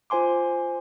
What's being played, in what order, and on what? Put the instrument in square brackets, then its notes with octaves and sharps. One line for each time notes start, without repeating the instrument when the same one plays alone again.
[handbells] F4 C5 G#5 C6 D6